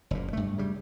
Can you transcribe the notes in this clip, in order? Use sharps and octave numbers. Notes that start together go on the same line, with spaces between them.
F#1 A#2
G2 A3
C#3 G3